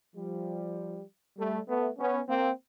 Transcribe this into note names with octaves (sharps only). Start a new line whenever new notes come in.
F3 G3
G3 A3
A3 B3
B3 C#4
A#3 C4